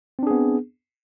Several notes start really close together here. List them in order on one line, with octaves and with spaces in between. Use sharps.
C4 D4 G#4 B3